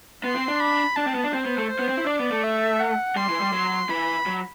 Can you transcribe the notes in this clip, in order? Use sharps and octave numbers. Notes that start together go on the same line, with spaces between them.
B3 C6
C4
D4
B5
D4 A5
C4
B3
D4
C4 C5
B3
A3
C5
B3
C4
E4
D4 D5
B3
A3
E5
F#5
G3 C6
E3
G3
F#3
E3 B5
F#3